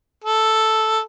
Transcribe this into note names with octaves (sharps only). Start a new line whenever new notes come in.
A4